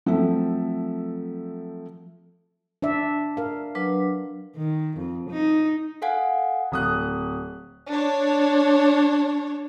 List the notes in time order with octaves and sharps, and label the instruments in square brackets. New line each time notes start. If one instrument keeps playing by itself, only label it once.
[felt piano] F3 F#3 A3 C4 A4 E5
[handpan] D4 D5 E5
A#4 F5
[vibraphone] F#3 D4 B4
[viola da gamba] D#3
F2
D#4
[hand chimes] A4 F5 F#5 G#5
[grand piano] D1 D#6 F#6
[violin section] D4 C#5